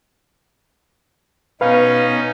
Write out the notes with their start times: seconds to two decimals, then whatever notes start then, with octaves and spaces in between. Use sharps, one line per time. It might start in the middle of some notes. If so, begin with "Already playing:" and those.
1.61 B2 C#4 D#4 B4 F5